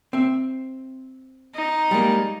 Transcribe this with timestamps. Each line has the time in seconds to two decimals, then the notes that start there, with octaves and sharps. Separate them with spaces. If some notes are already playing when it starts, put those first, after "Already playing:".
0.13 C4 E5
1.55 D#4
1.91 G3 G#3 A#3